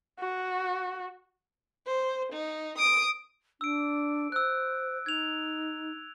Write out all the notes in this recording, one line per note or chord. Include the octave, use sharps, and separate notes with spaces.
F#4
C5
D#4
D#6 D7
D4 E6 D7
C5 E6 F#6
D#4 G#6 F7